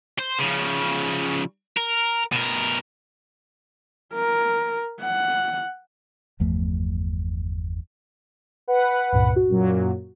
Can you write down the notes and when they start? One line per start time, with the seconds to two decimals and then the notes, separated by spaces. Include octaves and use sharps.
0.19 C5
0.39 C#3 F3
1.77 A#4
2.32 B2 A#4
4.14 A#4
5.00 F#5
6.40 G1 E2 F3 A3
8.68 B4 F#5
9.13 C#2 G2 A#2
9.36 F#4
9.49 F#2 A#2 F#3